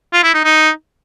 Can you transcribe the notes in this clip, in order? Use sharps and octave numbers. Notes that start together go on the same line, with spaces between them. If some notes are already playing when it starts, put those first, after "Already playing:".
F4
E4
D#4
D#4